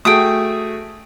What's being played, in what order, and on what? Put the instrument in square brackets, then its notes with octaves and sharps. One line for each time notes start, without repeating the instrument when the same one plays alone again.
[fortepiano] A3 F#4 G#4 [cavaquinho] G5 D#6